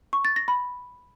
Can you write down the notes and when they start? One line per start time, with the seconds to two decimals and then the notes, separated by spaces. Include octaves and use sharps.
0.13 C#6
0.25 A6
0.36 A#6
0.48 B5